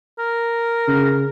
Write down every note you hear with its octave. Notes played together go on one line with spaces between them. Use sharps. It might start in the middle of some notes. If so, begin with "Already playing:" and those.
A#4
C#3